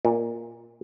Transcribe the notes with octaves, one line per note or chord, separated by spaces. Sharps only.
A#2